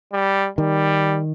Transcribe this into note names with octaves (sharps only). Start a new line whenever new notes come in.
G3
D#3 G3